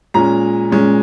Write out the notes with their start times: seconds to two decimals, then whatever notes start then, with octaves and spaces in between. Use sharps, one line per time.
0.14 A#2 G#3 C#4 A#5
0.71 A#2 G#3 C#4